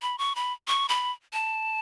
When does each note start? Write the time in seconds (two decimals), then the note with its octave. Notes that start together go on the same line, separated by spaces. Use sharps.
0.02 B5
0.18 C#6
0.35 B5
0.68 C#6
0.89 B5
1.33 A5